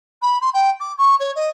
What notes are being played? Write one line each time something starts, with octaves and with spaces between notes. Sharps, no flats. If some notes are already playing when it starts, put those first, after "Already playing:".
B5
C6
G5
D6
C#6
C#5
D#5